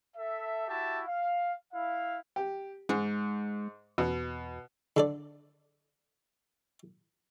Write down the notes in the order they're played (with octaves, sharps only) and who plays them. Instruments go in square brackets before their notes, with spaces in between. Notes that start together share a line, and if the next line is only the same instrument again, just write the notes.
[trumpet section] A4 E5
E4 F#4 G4 E5 A5
F5
E4 F5
[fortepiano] G4
[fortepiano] G#2 [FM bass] G#3
[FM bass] E2 [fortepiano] B2
[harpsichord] D3 A4 D5